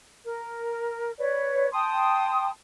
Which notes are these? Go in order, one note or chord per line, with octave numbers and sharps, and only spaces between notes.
A#4
B4 C#5 D5
G5 A5 C6 D#6